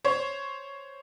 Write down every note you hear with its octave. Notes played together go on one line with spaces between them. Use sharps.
C5 C#5